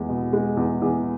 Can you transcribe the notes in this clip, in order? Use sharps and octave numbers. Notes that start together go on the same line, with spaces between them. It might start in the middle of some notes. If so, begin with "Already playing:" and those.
Already playing: E2 G#3
B2
G#3
E2
E2